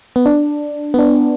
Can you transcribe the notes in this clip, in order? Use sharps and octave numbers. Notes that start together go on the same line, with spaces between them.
B3
D4
B3
D4